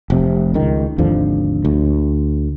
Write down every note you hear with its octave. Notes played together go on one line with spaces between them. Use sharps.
F1 C3
C#2 D#3
G#1 D#2 D3 F3
D2